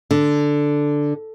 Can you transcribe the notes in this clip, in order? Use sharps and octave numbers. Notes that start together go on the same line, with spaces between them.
D3